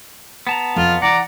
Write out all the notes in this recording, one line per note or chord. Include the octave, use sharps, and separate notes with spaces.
B3 A5 A#5
F2 F4
E3 D5 F#5 A#5